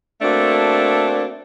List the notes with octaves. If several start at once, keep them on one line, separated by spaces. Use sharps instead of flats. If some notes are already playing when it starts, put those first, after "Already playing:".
A3 A#3 C4 D4 F#4